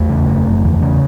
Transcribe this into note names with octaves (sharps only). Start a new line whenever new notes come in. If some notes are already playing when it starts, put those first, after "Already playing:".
Already playing: E2 A3
C#3
F#1
F#1
E2
C#3